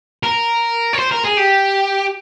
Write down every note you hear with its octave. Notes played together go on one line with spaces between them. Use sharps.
A#4
C#5
C5
A#4
G#4
G4